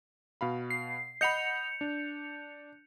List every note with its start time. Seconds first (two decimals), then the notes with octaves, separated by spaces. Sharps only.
0.41 B2 F5 B5
0.70 C7
1.21 D#5 F#5 B5 G6 C#7 F7
1.81 D4